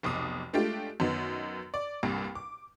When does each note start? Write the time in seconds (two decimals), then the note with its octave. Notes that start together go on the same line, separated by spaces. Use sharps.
0.03 F1 B1 D6 D#6
0.53 G#3 A3 D4 F4 G4
1.00 F#2 D#3 B3
1.74 D5
2.03 C2 G2 A#2
2.35 D6